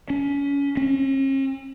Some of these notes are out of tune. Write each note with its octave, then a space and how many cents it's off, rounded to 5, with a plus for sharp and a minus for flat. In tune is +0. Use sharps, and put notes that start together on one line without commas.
C#4 +25
C#4 -45